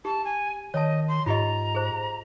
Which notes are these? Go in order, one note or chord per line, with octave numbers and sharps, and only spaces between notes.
G4 A5
G#5
D#3 C#5 D#5 A5
C6
G#2 F4 G4 D#5 A#5
G#4 C5